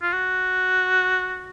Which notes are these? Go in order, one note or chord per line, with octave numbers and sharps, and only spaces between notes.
F4
F#4